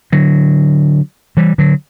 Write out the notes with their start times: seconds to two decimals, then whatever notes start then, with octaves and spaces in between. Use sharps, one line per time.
0.12 D3 F#3
1.37 E3 G3
1.58 D3 F#3